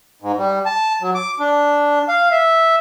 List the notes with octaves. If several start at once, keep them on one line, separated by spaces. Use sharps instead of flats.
G#2
G3
A5
F#3
D6
D4
F5
E5